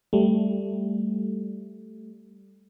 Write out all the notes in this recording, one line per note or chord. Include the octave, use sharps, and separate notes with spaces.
G3 A3